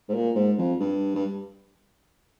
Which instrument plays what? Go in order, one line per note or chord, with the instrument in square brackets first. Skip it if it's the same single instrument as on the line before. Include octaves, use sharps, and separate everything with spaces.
[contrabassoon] G#2
A#2
G#2
F2
G2
G2